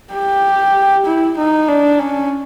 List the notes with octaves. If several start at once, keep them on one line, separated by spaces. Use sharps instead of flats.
G4
E4
D#4
D4
C#4